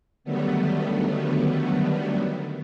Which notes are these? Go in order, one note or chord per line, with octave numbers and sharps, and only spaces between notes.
D3 D#3 F#3 G3 A3 B3